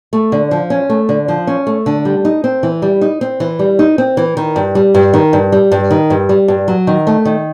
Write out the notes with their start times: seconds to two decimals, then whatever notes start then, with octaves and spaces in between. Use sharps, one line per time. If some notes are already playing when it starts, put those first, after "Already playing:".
0.13 A3
0.32 D3
0.51 F3
0.70 C#4
0.89 A3
1.09 D3
1.28 F3
1.47 C#4
1.67 A3
1.86 D3
2.05 G3
2.25 D#4
2.44 C4
2.63 E3
2.82 G3
3.01 D#4
3.21 C4
3.40 E3
3.59 G3
3.79 D#4
3.98 C4
4.17 E3
4.37 D#3
4.56 G2
4.75 G3
4.94 G2
5.14 D#3
5.33 G2
5.52 G3
5.72 G2
5.90 D#3
6.10 G2
6.29 G3
6.48 G2
6.68 F#3
6.87 D#3
7.07 A3
7.25 D#3